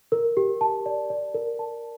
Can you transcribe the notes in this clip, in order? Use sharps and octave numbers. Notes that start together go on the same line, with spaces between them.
A#4
G4
A5
D5
D5
A#4
A5